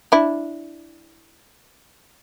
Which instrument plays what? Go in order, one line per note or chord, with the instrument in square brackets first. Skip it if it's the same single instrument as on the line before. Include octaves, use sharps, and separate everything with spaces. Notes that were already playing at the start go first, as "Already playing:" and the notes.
[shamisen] D4 E4